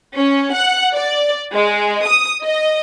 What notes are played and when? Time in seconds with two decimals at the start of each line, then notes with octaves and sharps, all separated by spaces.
0.16 C#4
0.55 F#5
0.94 D5
1.54 G#3
2.07 D#6
2.43 D#5